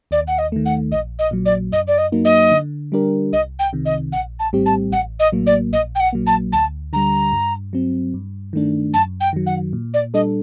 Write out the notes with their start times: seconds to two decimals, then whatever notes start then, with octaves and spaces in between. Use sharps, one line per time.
0.11 D#2 D5
0.28 F#5
0.38 D#5
0.52 D#3 A3
0.66 F#5
0.92 A#1 D#5
1.19 D#5
1.31 A#2 F#3
1.45 D5
1.72 F#2 D#5
1.87 D5
1.98 D#5
2.12 F#3 A#3 D#4
2.25 D#5
2.51 D3
2.92 G3 D4 G4 A#4
3.33 C2 D#5
3.59 G5
3.73 C3 D#3
3.85 D#5
4.12 A#1 F#5
4.39 A5
4.53 A2 G3 C4 G4
4.66 A5
4.92 A1 F#5
5.19 D#5
5.32 A2 F#3 A#3
5.46 D5
5.72 A#1 D#5
5.95 G5
6.00 F#5
6.13 A#2 F#3 A#3
6.26 A5
6.52 D2 A5
6.93 D3 G3 A#5
7.33 G2
7.73 F#3 C4
8.14 G2
8.53 D#3 A3 D4
8.93 F#2 A5
9.20 G5
9.33 D#3 F#3
9.46 F#5
9.73 A#2
9.94 D5
10.14 G3 D4 A4 D#5